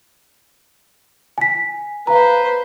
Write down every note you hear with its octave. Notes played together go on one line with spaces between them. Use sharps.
G#5 B6
B4 C5 F5 A#5